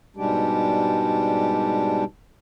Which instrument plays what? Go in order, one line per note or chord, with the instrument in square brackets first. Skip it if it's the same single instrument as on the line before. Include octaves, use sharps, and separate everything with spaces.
[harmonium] G#2 B2 G3 G#3 D4 G4